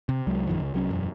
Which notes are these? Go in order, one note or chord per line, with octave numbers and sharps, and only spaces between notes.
C3
C2 F#3 G#3
A#1 F#2 D#3 F3
C#2
C2 F#3 C#4
E1 F#2